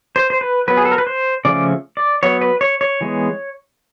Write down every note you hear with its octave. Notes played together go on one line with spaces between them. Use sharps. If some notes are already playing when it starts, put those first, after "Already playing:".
C5
C5
B4
F#3 B3 B4
G#4
A4
A#4
B4
C5
C#3 F3 A3 C#4 D5
D5
F#3 B3 C#5
B4
C#5
C#5
E3 G#3 B3